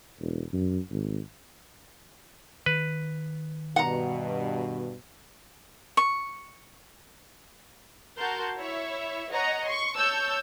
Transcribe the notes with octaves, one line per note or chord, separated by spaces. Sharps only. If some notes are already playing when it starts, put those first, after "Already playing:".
E1
F#2
G#1
D#3 B4
G2 B2 F#5 A#5
C#6
F#4 A#4 A5 C6 G6
E4 C#5 E5
C#5 D#5 F#5 A#5
C6 C#6
C#5 A5 E6 G6